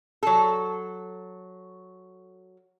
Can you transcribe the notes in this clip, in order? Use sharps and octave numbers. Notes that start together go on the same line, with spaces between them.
F#3 A4